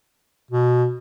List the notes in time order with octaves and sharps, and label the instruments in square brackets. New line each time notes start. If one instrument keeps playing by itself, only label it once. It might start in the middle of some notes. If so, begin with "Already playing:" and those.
[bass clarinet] B2